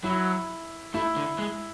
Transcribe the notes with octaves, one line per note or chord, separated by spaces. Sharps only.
F#3 E4
A3 E4
D3
G#3